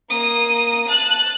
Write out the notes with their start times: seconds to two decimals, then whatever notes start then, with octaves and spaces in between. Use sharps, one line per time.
0.10 A#3 D#6
0.88 A5 F#6